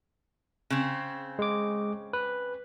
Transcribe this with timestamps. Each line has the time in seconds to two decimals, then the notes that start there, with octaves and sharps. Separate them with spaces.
0.70 C#3 C4
1.39 G#3 D6
2.13 B4